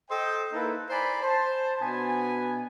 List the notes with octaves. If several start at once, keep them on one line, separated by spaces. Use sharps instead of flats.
A4 C5 D#5 G5
A#3 D#4 E4 A4 B4
C5 D5 G#5 A#5 B5
C5 A5
B2 B3 D4 G#5